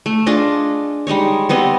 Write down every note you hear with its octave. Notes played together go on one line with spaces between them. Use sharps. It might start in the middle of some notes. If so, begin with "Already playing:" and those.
A3
D4 F4 G#4 D#5
G3 G#3 D#4 C#5
G3 B3 C4 D#5